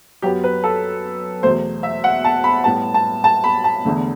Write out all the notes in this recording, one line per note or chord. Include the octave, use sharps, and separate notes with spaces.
F#2 F#3 B3 G4
B4
A4
E2 B2 A3 C5
E5
F#5
A5
B5
A2 G3 B3 A5
A5
A5
B5
A5
E2 D3 A3